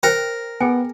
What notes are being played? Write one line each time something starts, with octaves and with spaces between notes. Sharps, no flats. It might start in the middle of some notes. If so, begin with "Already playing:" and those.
A#4 C5 G5
B3 G#4 G5 G#5